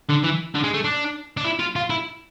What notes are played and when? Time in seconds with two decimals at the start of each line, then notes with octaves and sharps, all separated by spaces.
0.09 D3
0.23 E3
0.55 D3
0.64 G#3
0.74 A3
0.84 D4
1.37 D4
1.45 E4
1.60 F4
1.76 F4
1.90 E4